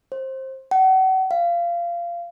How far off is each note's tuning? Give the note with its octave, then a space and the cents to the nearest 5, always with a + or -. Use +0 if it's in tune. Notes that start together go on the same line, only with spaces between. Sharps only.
C5 +20
F#5 +40
F5 -20